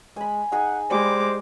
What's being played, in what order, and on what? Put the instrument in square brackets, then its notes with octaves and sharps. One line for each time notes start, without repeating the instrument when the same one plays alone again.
[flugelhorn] G#3 [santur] G#5 B5
[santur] D#4 G#4 G#5 [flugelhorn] F#5
[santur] G3 [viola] G#3 D6 [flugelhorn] C5